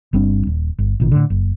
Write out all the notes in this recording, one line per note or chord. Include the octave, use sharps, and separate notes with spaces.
G1 G3 C4 D4
D#1
G1
A1 A#2 D#3
A2 D3
F#1